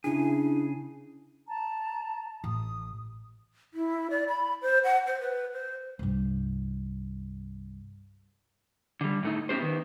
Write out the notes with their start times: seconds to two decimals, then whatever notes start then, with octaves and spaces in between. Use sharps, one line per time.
0.04 C#3 D4 E4 G#4
1.48 A5 A#5
2.44 A1 D#6
3.74 E4
4.10 D5
4.28 B5
4.62 C5
4.84 F#5
5.07 C5
5.21 B4
5.53 C5
5.99 C2 G2
9.01 D3 G3
9.23 A2 A3 D#4
9.49 B3 C#4 E4 G4 C5
9.61 D#3 B3